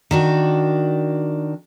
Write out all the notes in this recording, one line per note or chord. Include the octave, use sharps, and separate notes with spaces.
D#3 D4 F#4